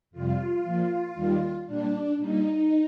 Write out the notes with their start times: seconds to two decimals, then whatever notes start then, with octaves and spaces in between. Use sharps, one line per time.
0.11 F2 C3 G3 F4
0.63 A#2 F3
1.14 D#2 D#3 G3
1.65 A#2 G3 D4
2.17 A#2 G3 D#4